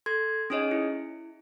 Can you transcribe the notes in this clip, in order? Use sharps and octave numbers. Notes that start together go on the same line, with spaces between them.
A4 C6 G#6
C#4 D#4 G#4 C#5 D#5
E4